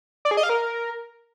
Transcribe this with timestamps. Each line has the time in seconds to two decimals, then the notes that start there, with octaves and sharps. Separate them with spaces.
0.25 D5
0.31 G#4
0.37 D#5
0.43 F5
0.49 A#4